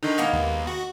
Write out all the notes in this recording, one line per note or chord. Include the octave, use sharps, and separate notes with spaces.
D3 D#3 D#4
G#3 A#3 B3 D#5
D#2
F#4